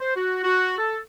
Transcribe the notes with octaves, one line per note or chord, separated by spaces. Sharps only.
C5
F#4
F#4
A4